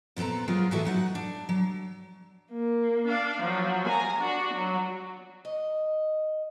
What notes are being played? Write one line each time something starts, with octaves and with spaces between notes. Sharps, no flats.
A#2 B3 C4 A4 A#5
F#3 A#3 B3 F4 G#4
A2 E3 F#4 G#4 A4 E5
F#3 D#4 F#5
D4
F#3
A#3
D4 F5
F3 F#3
G#5 A#5
D4 F#4
F#3
D#5